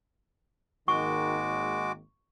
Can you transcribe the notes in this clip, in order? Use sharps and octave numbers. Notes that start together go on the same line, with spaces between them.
G#1 D#3 G#3 A#3 F#4 C#6 D6